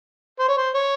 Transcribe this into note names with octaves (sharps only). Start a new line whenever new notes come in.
C5
C#5
C5
C#5